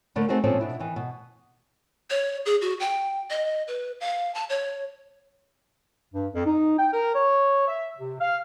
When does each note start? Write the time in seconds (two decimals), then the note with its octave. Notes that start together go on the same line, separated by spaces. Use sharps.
0.16 D3 A3 A#3 B4 D5
0.29 A3 C4 D#4 F#4 G#4
0.44 A#2 F3 C4 C#4 A4 D5
0.59 B2 D4 E4
0.80 D#3 E3
0.96 B2
2.10 C#5
2.46 G#4
2.61 F#4
2.80 G5
3.30 D#5
3.68 B4
4.01 F5
4.35 A5
4.49 C#5
6.13 G2
6.33 F2
6.45 D#4
6.78 G5
6.93 A#4
7.14 C#5
7.68 E5
7.97 C3
8.19 F5